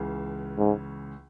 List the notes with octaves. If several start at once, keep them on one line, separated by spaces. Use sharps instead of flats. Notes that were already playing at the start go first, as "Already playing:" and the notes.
Already playing: C#2 C#3 E3
G#2